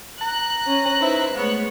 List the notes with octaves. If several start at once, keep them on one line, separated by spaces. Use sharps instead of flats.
A#5 F#6
C#4
D#4 E4 B4 C5
G#3 A3 B3 C#5